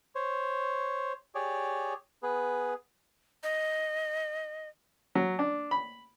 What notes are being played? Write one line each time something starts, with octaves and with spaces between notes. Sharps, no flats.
C5 C#5
G4 G#4 C#5 D5
B3 G#4 B4
D#5
F#3
D4
B5